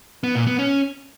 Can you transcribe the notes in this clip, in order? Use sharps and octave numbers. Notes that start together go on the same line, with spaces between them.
B3
A#2
B3
C#4